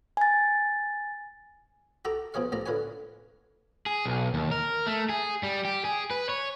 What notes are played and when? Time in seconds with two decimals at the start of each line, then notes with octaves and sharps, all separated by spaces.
0.17 G#5 A6
2.05 F#4 G4 A4 G5 A#5
2.34 B2 F3 G#4 C#5 F5
2.52 A1 F3 D5 A#5
2.66 D3 F4 B4 C#5 G#5
3.86 G#4
4.05 B1
4.34 D#2
4.51 A#4
4.87 A3
5.09 G#4
5.43 G3
5.65 G4
5.85 G#4
6.11 B4
6.29 C#5